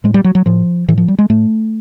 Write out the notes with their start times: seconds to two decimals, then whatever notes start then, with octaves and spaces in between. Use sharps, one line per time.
0.04 A2 G#3
0.14 G3
0.24 F#3
0.35 F#3
0.46 A2 F3
0.88 A2 E3
0.98 F3
1.08 G3
1.19 G#3
1.30 A2 A3